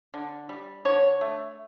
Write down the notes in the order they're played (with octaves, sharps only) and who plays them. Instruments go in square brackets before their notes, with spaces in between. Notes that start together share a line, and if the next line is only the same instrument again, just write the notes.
[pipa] D3
G3
D3 C#5
A3